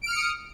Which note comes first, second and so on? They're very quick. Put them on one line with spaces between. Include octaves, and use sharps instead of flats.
D7 F6 C#7 D#6